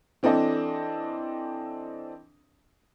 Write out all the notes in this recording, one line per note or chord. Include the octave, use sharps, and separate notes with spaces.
E3 C4 D4 A4 D#5